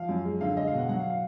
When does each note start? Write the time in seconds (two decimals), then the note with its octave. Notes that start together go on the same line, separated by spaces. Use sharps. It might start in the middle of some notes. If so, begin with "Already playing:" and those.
Already playing: F3 F5
0.09 F#2
0.25 G#3
0.41 D3 F5
0.57 G#3 D#5
0.67 F5
0.73 B2 F#5
0.89 F#3 F#5
1.00 F5
1.10 F5